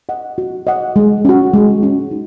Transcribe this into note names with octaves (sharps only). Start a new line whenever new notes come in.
D#5 F#5
F#4
D#5 F#5
G#3
C#4 F#4
G#3
C#4 F#4
D#4